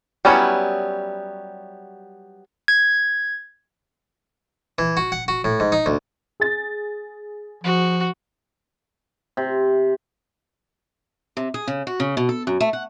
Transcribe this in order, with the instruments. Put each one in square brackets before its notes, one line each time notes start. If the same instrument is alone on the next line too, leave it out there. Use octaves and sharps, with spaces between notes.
[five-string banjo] F#3 G3 B3 C#4 E4
[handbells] G#6
[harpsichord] E3
F#4
F#5
F#4
A2
G#2
D#4
D2
[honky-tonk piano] G#4 A6
[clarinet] F3 [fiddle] F#4
[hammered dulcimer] C3
[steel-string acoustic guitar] C3
G#4
C#3
F#4
C#3
B2
A4
F#2
A3
F#5